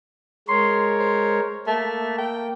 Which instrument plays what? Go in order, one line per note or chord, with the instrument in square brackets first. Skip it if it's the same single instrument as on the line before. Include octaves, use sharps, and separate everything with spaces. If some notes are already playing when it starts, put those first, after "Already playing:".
[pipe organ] G#3 A#4 C#5 [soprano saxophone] C6
[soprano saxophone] C5
[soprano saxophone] A3 [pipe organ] A#3
[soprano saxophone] G5